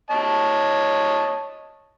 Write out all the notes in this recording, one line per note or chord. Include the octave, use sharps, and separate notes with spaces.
C#5 D#5 A5